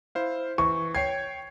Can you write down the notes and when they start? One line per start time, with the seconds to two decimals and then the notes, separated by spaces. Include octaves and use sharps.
0.15 E4 C5 F5
0.58 E3 C#6
0.95 C#5 G5 G#6 C7